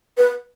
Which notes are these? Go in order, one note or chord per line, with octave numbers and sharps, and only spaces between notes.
B4